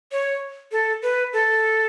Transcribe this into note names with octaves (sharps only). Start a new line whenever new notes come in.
C#5
A4
B4
A4